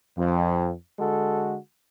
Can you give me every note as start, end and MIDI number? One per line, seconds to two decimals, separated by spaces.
0.18 0.73 41
0.99 1.57 50
0.99 1.57 56
0.99 1.57 66
0.99 1.57 69